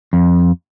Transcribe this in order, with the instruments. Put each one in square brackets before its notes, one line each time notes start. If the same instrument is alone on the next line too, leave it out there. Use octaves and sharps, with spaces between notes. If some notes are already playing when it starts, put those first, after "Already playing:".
[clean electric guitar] F2